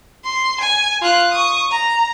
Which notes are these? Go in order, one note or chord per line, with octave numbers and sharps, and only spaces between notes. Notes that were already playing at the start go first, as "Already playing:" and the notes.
C6
G#5
F4 F#6
C#6 D#6
A#5